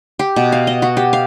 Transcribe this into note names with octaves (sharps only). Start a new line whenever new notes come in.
G4
B2
F5
D#5
F#4
G4
F5